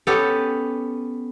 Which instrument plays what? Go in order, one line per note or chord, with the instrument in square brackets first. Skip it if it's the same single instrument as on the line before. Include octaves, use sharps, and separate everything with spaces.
[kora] B3 C#4 G4 A4